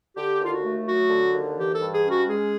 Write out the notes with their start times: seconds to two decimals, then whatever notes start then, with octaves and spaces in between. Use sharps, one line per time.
0.16 D3 G4
0.39 D#2 F4
0.51 F#4
0.63 A3
0.86 F#3 F#4
1.09 D3
1.33 D#2
1.57 E3 G4
1.74 A4
1.79 G2
1.91 G#4
2.03 C#4
2.10 F#4
2.26 G#3 G#4